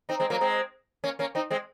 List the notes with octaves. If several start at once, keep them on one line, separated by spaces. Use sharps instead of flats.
C4 D#4
G#3 C4
F#3 A#3
G#3 C4
A#3 C#4
A#3 C#4
C4 D#4
G#3 C4